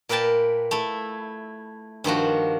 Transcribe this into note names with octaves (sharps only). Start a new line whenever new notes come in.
A#2 A#4 B4 G5 A5
A3 E4
G2 D#3 F3 F#4